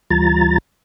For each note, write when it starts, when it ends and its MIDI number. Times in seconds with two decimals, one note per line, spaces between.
0.11 0.58 38
0.11 0.58 52
0.11 0.58 55
0.11 0.58 65
0.11 0.58 82
0.11 0.58 93